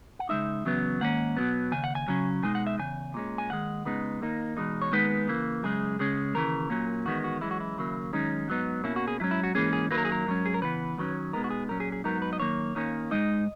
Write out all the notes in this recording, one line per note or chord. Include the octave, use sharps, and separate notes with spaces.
F#5
C#3 G#3 D#4 E5
E2 C#3 F#3 B3
G#2 D#3 A#3 C#4 F#5
B2 F#3 B3
D#2 C#3 G#5
F#5
G#5
C#3 F#3 C#4
B2 G#3 D#4 G#5
F#5
E5
E2 C#3 G#5
A#2 G#3 C#4
G#5
D#2 D#3 G#3 F#5
C#3 G#3 B3 D#4
D#2 D#3 A#3 D#4
E2 B2 G#3 D#4
C#5
D#2 D#3 G#3 B3 D#4 B4
C#3 E3 A#3
F#2 C#3 G#3 G#4
C#2 C#3 G#3 C#4
D#2 C#3 E3 A#4
A#2 F#3 A#3 C#4
E2 D#3 G#3 B3 F#4
F#4
F#2 E3 G#3 C#4 E4
F#4
E4
D#2 C#3 F#3 A#3
F#2 D#3 G#3 C#4 D#4
G#2 F#3 B3 D#4
B2 A#3 C#4 E4
F#4
G#4
G#2 F#3 C#4 E4
E4
F#4
G#2 E3 A#3 C#4 G#4
G#4
F#2 D#3 F#3 A#3 B4
A#4
G#4
A#4
G#2 F#3 C#4
G#4
A#4
C#3 E3 B3 B4
F#2 D#3 F#3 C#4
B2 G#3 B3 D#4 A#4
F#4
G#4
A#2 F#3 C#4 A#4
G#4
G#4
G#2 F#3 B3 D#4 A#4
B4
D#5
F#2 D#3 A#3 C#5
D#2 D#3 A#3 C#4
G#2 D#3 G#3 D#4 D#5